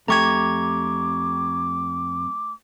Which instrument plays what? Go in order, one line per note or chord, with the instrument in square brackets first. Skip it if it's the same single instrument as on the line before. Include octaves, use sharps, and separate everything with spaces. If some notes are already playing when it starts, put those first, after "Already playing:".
[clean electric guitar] F2 G4 [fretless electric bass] A3 [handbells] A#5 C#6 G#6 [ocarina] D6